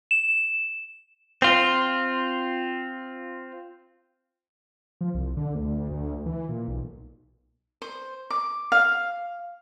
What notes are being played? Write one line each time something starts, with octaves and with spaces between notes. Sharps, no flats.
E7
C4 F4
F3
C2
D3
D2
D2
E3
A#2
B1
C5
D6
F5